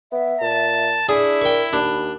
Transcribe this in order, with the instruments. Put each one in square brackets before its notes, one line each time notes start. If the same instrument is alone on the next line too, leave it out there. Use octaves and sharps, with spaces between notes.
[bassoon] B3 [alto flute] E5
[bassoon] A#2 [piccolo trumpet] A5
[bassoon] D4 [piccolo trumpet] E4 [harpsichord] G#4
[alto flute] A#4 [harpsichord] G5 C#6
[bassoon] D#2 [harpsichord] D4 [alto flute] B5